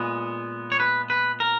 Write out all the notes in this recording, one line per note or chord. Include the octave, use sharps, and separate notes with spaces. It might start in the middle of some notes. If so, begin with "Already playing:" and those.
Already playing: A#2 G#3 B3
C#5
B4
B4
A#4